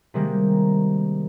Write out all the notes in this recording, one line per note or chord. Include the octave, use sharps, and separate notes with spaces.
C3 D#3 G3 G#3 A#3